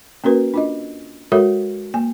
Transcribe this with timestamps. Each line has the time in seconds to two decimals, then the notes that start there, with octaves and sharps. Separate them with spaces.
0.24 A#3 C#4 F#4 A#4 B4
0.54 D4 F4 D#5
1.32 G#3 F#4 A4 A#4 C#5 E5
1.94 A#3 G#5